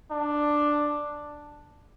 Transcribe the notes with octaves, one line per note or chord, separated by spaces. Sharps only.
D4